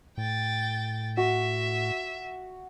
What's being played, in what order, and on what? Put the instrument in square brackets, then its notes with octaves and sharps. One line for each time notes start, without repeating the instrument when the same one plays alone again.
[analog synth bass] A2 [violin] G5 A6
[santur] F#4 [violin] E5